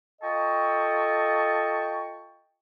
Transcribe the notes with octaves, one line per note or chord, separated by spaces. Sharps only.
F4 A4 D#5 G5 A5 C#6